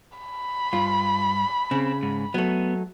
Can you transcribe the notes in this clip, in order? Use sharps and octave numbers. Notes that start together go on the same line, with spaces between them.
B5
G2 F4
C#3 C4
G#2
F#3 A3 B3